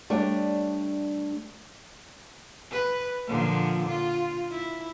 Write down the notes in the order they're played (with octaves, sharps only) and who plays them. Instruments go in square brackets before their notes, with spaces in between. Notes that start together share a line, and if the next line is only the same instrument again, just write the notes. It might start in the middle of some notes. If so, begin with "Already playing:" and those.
[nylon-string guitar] G3 A3 D4 C#5
[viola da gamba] B4
A#2 D3 F3
F4
E4